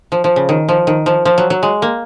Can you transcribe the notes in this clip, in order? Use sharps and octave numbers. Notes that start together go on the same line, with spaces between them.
F3
F3
C#3
D#3
F3
D#3
F3
F3
F#3
F#3
G#3
A#3